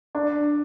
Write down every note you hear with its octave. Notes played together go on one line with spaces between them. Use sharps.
D4